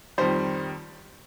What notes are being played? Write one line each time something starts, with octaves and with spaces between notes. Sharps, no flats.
F2 D#3 G3 C5